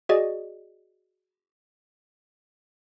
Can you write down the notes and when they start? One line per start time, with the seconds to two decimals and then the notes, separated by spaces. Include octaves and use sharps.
0.09 F#4 G#4 D5 D#5